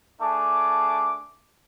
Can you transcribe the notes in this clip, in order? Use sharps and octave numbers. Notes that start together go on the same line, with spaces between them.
A3 D4 G#4 A5 D6